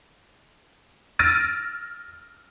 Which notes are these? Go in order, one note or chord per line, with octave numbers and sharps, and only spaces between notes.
E6 F6 A6 A#6 D7 D#7